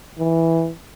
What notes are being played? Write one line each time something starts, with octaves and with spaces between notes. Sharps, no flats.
E3